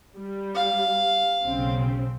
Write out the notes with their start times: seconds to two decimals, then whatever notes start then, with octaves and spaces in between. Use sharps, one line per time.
0.17 G3
0.55 F5
1.42 B1 C#3 C4